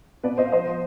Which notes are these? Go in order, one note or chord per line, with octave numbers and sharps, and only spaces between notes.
B2 B4 D5
B2 C5 D#5
F5
F3 C5 D#5
F3